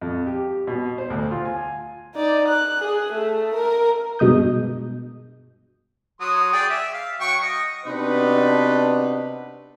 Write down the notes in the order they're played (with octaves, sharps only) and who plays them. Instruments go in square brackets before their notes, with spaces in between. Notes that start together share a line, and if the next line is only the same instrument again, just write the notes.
[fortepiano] F2
G4
B2
C5
D2
F4
G#5
[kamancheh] D#4 D5
F#6
G#4
A3
A#4
[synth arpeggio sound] G2 B2 G#3 D#6 G6
[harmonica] F#3 C6 D#6
G#4 D5 G5
E5
F5
F#3 G5 C#6
D#5
[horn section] C3 B3 D4 D#4 F#4 B4